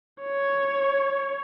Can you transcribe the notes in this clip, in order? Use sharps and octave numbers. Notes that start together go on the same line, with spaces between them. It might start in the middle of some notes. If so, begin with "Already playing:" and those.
C#5